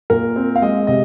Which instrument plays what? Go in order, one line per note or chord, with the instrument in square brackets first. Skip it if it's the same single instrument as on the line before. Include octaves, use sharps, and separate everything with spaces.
[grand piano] A#2 A#4
C4
F5
G#3 D#5
C3 D#5